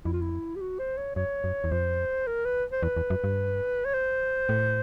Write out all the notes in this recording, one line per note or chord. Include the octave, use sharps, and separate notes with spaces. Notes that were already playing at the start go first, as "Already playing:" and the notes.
F2 E4
F4
E4
G4
F#4
C5
C#5
F#2 C#5
F#2
E2
F2 C5
A#4
B4
C5
E2 B4
E2
F#2
G2
C#5
C5
A2